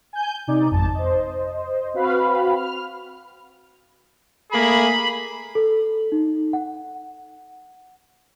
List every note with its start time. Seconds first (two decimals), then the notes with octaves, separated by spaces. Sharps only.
0.13 G#5 G6
0.47 C3 D#4 D5
0.71 G#1 F2 A5
0.95 C5 D#5
1.94 C4 F#4 B4 F5 B5
2.56 F6
4.52 A3 A#3 G#4 B5
5.55 A4
6.12 D#4
6.53 F#5